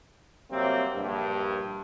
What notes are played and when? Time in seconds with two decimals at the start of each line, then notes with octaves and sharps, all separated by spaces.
0.51 C3 F#3 G3 A#3 C4
0.95 A#1 G2